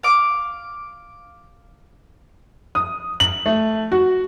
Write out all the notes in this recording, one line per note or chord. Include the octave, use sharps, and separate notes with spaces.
F5 D6
D#6
F#7
A3
F#4